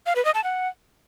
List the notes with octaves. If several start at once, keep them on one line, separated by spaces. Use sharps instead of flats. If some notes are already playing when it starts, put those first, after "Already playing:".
F5
B4
D#5
A5
F#5